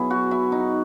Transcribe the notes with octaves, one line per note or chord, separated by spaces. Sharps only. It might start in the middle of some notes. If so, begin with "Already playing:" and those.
Already playing: B2 F#3 E4 G#4
F#4
E4
D#4